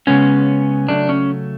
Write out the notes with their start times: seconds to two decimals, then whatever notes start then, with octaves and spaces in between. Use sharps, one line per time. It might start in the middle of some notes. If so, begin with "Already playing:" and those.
0.07 C#3 G#3 B3 C#4
0.89 C#3 F#3 A3 D4
1.09 C#4